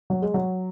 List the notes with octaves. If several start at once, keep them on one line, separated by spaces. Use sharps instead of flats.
F#3
G#3
F#3